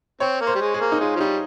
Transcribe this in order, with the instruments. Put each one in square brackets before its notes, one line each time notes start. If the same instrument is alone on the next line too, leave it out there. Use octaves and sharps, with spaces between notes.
[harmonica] C4 [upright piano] C#5
[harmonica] A#3
[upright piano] C5
[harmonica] G3
G#3
[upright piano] G#4
[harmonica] A#3
[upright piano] D#4
[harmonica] G#3 [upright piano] F4
[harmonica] F3
[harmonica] G3 [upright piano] D#4